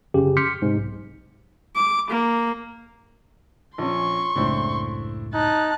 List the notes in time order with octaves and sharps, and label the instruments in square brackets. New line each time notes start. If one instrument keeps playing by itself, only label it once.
[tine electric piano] G1 F#2 C#3 G4
C6 D6 F6 G6 B6 C#7
G#2 C3
B1
[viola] D6
A#3
[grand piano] A#1 C#4 [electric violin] C6 C#6
[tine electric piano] C#2 F#2 A2 [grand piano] C4 D4 E4
[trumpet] D#4 [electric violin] A5 F#6